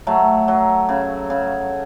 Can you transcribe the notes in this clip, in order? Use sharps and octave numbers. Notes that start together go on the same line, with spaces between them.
F#3 A3
F#3
C#3
C#3